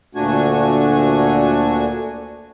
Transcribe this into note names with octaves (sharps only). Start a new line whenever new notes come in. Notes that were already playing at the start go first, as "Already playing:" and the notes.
D2 A#2 A3 D4 F#4 G#5